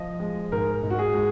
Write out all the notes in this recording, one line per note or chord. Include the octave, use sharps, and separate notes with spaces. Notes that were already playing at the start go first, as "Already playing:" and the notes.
Already playing: F3 D#5
G#3
G#2 A#4
G#2
F#4
G#4
G#3